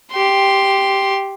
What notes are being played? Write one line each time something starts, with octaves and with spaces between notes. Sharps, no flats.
G4 C6